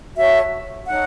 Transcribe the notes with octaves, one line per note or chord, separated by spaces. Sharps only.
F#4 A4 C#5 E5
D#4 A4 C#5 F#5